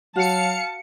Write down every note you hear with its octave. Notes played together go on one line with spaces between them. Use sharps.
F#3 F#4 F5 A5 C#7